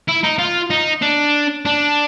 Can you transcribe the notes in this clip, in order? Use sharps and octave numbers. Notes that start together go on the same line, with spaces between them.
E4
D#4
F4
D#4
D4
D4